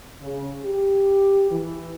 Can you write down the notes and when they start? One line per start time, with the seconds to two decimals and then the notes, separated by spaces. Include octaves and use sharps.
0.21 C#3
0.65 G4
1.51 E3